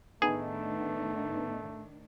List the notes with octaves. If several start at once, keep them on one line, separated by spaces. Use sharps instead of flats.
A2 D#3 A3 B3 D4 D#4 G#4